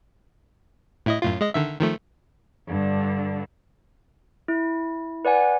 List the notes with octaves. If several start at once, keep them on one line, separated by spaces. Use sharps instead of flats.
A2 E4 D#5
F#2 A2 F4
G#3 D#5
D3 D#3 E5
D#3 F3 A3
G2 D3
E4
B4 D5 F#5 G#5